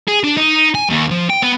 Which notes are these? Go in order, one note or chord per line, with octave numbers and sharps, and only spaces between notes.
G#4
D4
D#4
G#5
D#2
F3
G5
B3